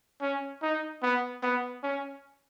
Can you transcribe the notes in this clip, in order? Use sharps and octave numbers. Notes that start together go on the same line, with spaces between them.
C#4
D#4
B3
B3
C#4